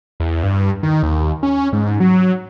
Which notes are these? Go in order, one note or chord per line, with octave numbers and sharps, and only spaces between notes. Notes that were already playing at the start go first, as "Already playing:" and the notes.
E2
G2
D#3
D#2
C#4
G#2
F#3